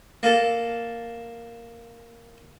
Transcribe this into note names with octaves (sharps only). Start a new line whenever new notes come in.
A#3 A4